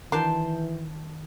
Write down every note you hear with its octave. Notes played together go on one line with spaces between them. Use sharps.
D#3 E3 D4 F#4 A#4 G5 A5 C6